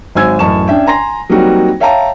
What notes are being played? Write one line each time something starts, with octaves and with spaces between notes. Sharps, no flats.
G#1 F#3 C5 G#5 E6 G#6
A1 F#2 A5 C#6 E7
C#4 D4 E5 G5
G#5 A#5 C6 A#6
F#3 G3 A#3 C4 D#4 F#4
C#5 E5 F5 G5 A5 A#5